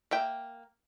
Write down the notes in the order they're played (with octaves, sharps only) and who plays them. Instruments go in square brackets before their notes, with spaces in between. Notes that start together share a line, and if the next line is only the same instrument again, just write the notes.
[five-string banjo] A#3 E5 G5